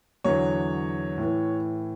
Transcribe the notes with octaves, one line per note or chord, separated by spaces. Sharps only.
E2 D3 F#3 C#5
A2 E3